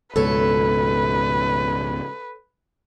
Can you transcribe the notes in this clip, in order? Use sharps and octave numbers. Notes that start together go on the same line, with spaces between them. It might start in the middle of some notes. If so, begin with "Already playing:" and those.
C#2 G#2 B2 A4 B4 C#5